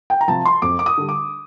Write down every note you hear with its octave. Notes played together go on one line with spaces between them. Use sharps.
G5
A#5
C3 F3 A5
C6
F2 D6
D6
D#6
D3 G3
D6